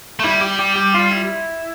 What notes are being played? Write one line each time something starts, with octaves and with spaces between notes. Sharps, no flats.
A3
G3 E4
G4
G4
G4
F4
E4